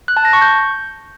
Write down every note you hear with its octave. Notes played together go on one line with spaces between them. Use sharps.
F#6
A5
A#6
C#6
G6